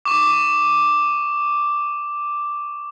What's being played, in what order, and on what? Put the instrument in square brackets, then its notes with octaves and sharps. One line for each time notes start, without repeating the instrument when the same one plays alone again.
[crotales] C#6 D6